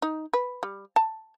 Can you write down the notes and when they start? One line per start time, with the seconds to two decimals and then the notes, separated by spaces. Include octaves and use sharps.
0.02 D#4
0.33 B4
0.63 G3
0.96 A5